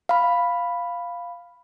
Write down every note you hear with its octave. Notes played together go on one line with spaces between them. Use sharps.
F5 B5